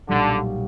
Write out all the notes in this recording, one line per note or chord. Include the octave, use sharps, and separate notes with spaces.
B1 A#2 D3 G3